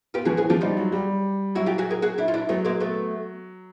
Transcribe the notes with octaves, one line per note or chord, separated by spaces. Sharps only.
B3 F4 G4
F3 F#4 G#4
E3 F#4 G#4
F3 F4 G4
G3 D#4 F4
F#3
G3
F#3 E4 F#4
F4 G4
F#4 G#4
G#4 A#4
F#4 G#4
D4 E4
F4
D4 E4
F#3 A3 B3
G#3 A#3
A3 B3